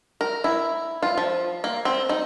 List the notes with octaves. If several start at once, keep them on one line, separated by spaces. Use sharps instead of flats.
A#4
E4
F4
F3
A#3
C4
D#4